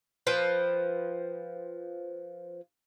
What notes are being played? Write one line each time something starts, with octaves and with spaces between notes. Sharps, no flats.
F3 B4 C5 G5